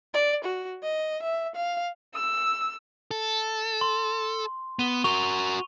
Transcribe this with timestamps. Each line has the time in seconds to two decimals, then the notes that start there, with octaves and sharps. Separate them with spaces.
0.14 D5
0.45 F#4
0.83 D#5
1.23 E5
1.55 F5
2.15 E6
3.11 A4
3.81 C6
4.79 B3 D#7 G7
5.04 F#4 A#4 C#6 F7